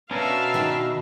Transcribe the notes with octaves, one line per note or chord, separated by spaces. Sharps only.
B2 C#4 D4 A#4 E5 F5
D#3 G5 A5